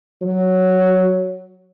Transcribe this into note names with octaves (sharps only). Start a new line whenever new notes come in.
F#3